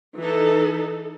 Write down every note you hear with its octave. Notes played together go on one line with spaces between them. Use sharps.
E3 D#4 A4